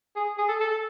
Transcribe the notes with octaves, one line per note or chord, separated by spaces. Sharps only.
G#4
G#4
A4
A4
A4